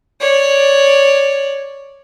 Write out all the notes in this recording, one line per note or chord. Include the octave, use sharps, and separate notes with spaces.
C#5 D5